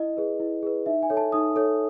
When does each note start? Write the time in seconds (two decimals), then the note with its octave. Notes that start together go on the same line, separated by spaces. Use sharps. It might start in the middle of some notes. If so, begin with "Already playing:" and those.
Already playing: E4 D#5
0.17 G#4 B4
0.40 E4
0.63 G#4 B4
0.86 D#4 E5
1.03 G#5
1.10 A4 C#5
1.17 A5
1.32 D#4 D#6
1.56 A4 C#5